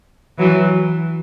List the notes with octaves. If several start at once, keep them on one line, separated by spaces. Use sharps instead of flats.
E3 F#3